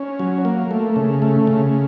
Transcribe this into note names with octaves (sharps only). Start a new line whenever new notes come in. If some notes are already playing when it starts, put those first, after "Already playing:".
Already playing: C#4
F#3
A#3
A3
C#3
A3
C#3